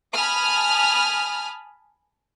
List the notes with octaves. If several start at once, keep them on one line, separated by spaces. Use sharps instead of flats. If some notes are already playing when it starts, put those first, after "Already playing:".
G#5 A5 B5 D#6 F6